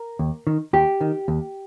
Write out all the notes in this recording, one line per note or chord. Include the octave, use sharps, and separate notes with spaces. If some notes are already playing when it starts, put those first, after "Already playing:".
Already playing: A#4
D#2
D#3
D#2 G4
D#3
D#2